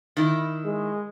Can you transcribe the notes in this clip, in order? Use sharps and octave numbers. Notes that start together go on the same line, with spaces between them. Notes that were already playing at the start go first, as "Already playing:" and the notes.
D#3 E4
G#3